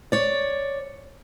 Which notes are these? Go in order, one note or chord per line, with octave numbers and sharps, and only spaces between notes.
C#5 D5